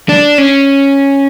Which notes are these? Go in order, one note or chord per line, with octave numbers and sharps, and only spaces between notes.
D4
C#4